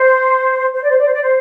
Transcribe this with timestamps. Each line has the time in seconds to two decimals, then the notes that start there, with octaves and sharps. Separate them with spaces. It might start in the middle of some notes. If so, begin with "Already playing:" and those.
Already playing: C5
0.74 C5
0.82 D5
0.89 C5
0.98 D5
1.06 C5
1.13 D5
1.22 C5